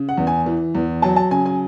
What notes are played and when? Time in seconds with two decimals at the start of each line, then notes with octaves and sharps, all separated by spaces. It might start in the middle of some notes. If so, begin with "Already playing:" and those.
Already playing: C#3
0.09 F#5
0.17 E2
0.27 G#5
0.46 E3
0.75 E2
1.02 F#3 A5
1.16 A5
1.31 C#3 G#5
1.46 G#5